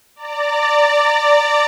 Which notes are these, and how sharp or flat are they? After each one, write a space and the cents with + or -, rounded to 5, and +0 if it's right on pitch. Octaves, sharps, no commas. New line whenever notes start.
D5 +0 A#5 -35